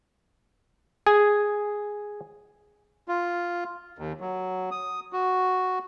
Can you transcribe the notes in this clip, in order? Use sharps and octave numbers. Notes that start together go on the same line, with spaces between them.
G#4
F4
D#2
F#3
D#6
F#4